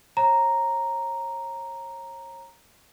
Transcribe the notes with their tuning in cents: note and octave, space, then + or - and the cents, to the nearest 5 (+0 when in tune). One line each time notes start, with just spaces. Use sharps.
C#5 -40 A#5 +0